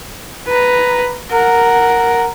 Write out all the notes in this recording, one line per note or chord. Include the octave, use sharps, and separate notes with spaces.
B4 A#5
A#4 F#5